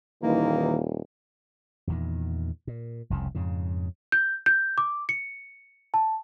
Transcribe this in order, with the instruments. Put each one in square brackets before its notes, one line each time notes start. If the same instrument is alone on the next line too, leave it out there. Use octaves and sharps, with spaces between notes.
[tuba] D#1 [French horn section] D#3 E3 [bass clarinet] A#3
[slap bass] E2 A#2 D#3
A#2
F1 C2 F2 C#3
F2 G#2 C#3
[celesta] G6
G6
D6
C#7
A5